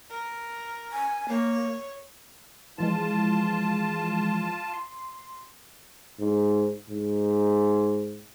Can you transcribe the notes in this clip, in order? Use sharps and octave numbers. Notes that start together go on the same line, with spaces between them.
A#4
G#5
A#3 C#5
E3 F3 G#3 F4 A5
C6
G#2
G#2